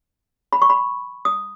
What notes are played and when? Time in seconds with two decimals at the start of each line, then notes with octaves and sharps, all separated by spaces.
0.53 B5
0.62 C#6
0.70 B5
1.25 D#6